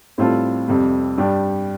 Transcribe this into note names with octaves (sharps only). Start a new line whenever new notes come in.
A2 G3 C4 F4 A4
F2 C3 G3
G2 G3 D4 G4